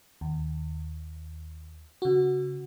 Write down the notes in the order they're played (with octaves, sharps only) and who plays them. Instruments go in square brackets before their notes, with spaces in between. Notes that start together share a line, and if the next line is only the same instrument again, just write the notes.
[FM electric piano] D#2
C#3 F#4